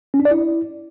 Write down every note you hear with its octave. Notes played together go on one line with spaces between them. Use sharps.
C#4
D4
D5
E4